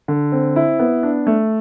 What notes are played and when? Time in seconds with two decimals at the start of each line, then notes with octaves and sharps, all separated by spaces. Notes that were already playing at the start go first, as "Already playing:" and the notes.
0.08 D3
0.32 C4
0.56 E4
0.79 B3
1.03 D4
1.27 A3